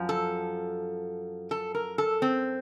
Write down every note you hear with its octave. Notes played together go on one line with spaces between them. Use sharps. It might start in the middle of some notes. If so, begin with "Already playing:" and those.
Already playing: F#2 F3
A4
A4
A#4
A4
C4